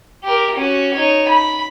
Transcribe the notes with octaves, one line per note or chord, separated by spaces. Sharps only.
G4 A#4
C#4 F#4
D#4 C#5
B5